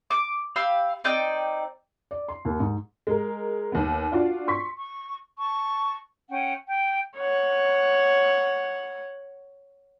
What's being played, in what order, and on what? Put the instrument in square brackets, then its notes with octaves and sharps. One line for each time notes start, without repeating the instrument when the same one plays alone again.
[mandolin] D6
G4 F5 B5 E6
C4 D#4 D5 G5
[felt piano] D5
C6
D#2
G#2
[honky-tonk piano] G#3 A#4
D#2 B3
D4 F4 F#4 D5
C6 C#6 B6
[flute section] C#6
A5 C#6
C#4 F#5 G5
G5
[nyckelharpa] C#5 F#5